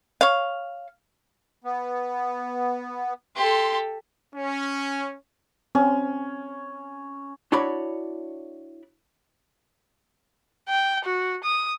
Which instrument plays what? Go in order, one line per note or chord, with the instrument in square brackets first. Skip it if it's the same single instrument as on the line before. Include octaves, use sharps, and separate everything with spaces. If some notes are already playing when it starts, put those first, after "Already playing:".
[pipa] C#5 F5
[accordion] B3
[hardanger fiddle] G4 A4 [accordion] C6
[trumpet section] C#4
[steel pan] C4 [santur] C#4
[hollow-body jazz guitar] D4 E4 F#4 C#5 D5 B5
[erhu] G5
F#4
D#6